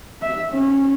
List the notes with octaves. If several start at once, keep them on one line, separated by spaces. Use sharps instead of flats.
E5
C#4